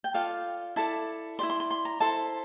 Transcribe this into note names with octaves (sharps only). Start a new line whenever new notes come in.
G5
F4 A4 D5 F5
E4 A4 D5 A5
E4 G4 D5 C6
C6
C6
C6
A#5
E4 A4 C5 A5